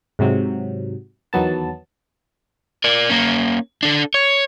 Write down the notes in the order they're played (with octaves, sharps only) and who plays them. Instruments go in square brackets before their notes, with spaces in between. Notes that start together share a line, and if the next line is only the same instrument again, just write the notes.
[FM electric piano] G#2 C3 F#3
E2 D#3 F#3 B3 A5
[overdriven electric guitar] A#4 D5
A#3 C#4
D4 A4
C#5